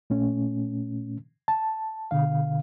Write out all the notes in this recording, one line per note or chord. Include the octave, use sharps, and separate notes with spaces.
A#2 A3 C#4
A5
B2 D3 F5